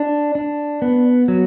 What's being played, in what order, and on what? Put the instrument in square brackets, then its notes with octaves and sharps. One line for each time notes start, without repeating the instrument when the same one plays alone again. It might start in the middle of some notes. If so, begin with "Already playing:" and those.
Already playing: [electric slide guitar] D4
D4
B3
F#3